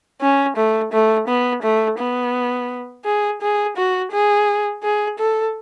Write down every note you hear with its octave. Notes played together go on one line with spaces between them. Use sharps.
C#4
A3
A3
B3
A3
B3
G#4
G#4
F#4
G#4
G#4
A4